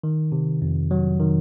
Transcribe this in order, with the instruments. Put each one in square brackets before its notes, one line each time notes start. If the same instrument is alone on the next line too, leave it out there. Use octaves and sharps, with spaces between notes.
[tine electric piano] D#3
C3
F2
F#3
D#3